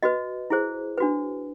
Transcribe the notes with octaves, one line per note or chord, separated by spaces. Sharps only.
F#4 B4 D#5
E4 G#4 C5
D4 F#4 B4